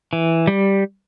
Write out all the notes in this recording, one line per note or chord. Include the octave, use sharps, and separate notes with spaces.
E3
G3